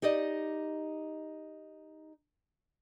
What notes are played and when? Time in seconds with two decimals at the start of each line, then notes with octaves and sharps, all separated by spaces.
0.02 D#4 G4 D5 D#5